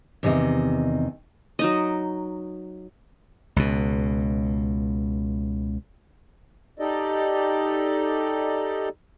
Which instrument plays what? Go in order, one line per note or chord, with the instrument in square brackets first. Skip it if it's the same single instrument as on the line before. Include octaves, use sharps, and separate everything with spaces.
[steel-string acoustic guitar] E2 C3 D#3 D#5
[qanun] F#3 D#4 D#5
[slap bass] C#2 B2
[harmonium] D#4 G4 A4 D5 D#5